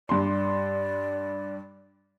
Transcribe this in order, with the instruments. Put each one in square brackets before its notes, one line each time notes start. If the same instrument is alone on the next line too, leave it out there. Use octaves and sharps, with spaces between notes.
[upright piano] G2 C6 [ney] D5